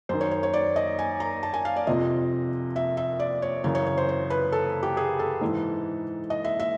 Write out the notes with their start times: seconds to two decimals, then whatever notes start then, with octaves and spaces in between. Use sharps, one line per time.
0.09 F#2 D#3 C5
0.21 C#5
0.31 C#5
0.43 C#5
0.54 D5
0.76 D#5
0.99 G#5
1.20 A#5
1.43 A5
1.54 G#5
1.65 F5
1.76 D5
1.87 F2 C3 F3 D#5
2.76 E5
2.97 E5
3.20 D5
3.42 C#5
3.64 F#2 C#3 E3 C#5
3.75 C#5
3.87 C#5
3.98 C5
4.09 C5
4.30 B4
4.52 A4
4.83 G4
4.97 G#4
5.19 A4
5.41 G#2 E3
6.30 D#5
6.44 E5
6.60 E5